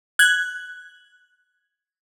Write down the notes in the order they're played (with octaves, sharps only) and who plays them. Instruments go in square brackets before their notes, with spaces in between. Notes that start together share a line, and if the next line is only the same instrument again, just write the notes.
[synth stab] F#6 G#6